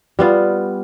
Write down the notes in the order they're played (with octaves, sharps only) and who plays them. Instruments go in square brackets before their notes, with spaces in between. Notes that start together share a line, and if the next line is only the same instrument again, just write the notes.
[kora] G3 B3 F4